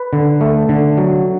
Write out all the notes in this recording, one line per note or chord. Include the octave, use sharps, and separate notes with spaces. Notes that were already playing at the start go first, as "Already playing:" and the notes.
Already playing: B4
D3
A3
D3
F#3